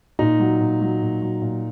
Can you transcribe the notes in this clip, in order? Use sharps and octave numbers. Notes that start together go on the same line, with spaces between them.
A#2 D#4
F#3
A#2
F#3
A#2
F#3
A#2